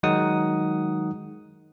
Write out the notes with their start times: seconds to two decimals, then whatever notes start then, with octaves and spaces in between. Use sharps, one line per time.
0.03 D#3 F#3 G#3 D#4 F#5 D#6